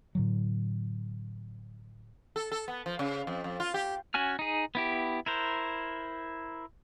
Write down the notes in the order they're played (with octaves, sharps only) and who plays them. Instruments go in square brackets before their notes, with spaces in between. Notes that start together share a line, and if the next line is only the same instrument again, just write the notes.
[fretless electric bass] A2 D3 F#3
[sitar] A4
A4
B3
F3
C#3
F2
F2
F4
G4
[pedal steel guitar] C#4 F#4 G#5 F6
D#4 G#4
B3 E4 G4
E4 A#4 C5